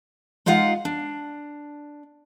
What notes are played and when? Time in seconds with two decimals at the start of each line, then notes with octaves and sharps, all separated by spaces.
0.46 G#3 D#4 F4 F5 F#5
0.85 D4